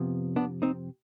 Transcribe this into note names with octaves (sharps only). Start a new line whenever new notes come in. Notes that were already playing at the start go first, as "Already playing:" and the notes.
Already playing: F2 C3 F3 B3
B3 D4
C4 D#4